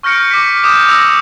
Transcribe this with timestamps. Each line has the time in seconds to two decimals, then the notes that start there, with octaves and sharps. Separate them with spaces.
0.03 C#6 F6 G6 A#6 C#7 D7
0.31 D6 B6
0.63 D6 D#6 G6 E7
0.89 D#6 E6 A#6 F7